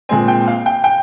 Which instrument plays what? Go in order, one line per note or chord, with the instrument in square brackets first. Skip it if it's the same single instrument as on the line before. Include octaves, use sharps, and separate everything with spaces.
[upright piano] A#2 G#3 C4 G#5
G5
F5
G5
G5